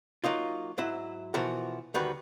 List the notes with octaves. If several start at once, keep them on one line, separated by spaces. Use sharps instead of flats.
F#3 A#3 D#4 F4
G#2 F#3 E4
B2 E3 F3 F#4 A#4
D2 D#3 G3 F#4 B4